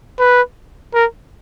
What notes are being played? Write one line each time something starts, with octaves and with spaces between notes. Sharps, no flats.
B4
A#4